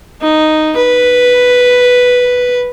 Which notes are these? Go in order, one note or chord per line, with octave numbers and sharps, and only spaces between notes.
D#4
B4